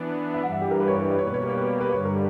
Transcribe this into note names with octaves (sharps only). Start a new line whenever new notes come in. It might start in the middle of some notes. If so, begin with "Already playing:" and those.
Already playing: E3 B3 D4
E5
G2 E3 G3 F#5
E5
G4
A#4
B4
C#5
B4
C#5
B4
B2 G3 A#3 C#5
B4
C#5
B4
C#5
B4
B4
G2 D3 G3 C#5
A#4